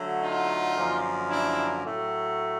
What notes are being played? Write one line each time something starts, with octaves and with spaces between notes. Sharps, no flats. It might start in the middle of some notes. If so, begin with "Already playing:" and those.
Already playing: D3 F#3 A3
D#4 F4
F#2 D3 F3 A#3
D4 E4
A2 F#3 A3